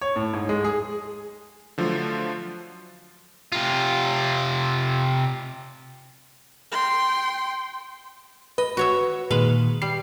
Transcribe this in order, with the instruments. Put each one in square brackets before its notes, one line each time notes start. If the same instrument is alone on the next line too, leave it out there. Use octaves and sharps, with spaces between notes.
[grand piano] C#5
A2
G#2
G#3
G#4
[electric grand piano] D3 F3 F#3 A3 F4
[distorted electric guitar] C3 F4
[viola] G5 C6
[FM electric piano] B4 [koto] D#5
[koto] F#4 C#5 E5
[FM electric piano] A#2 D#3 [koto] G#3 B4 F5
[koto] G3 [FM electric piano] C7